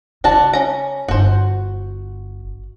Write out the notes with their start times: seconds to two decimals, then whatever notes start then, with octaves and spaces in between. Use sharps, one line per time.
0.24 C#3 D4 F#4 A5
0.53 C#4 A#5
1.08 G1 F#4 C5